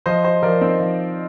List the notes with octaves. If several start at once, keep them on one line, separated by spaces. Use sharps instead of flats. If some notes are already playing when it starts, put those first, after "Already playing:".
F3 C5 D#5
C5 D#5
F3 A#4 D5
C4 D#4
F3